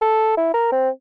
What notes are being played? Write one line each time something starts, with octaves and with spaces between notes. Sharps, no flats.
A4
E4
A#4
C4